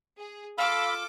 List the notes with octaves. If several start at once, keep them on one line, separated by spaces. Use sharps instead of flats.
G#4
F4 A4 F5 B5 D6 E6 F6